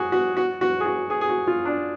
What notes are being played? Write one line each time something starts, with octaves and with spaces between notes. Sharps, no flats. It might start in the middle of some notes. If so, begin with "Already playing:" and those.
Already playing: F#4 G#4
F#4
F#4
F#4
G#4
F#4
G#4
G#4
F#4
F4
D4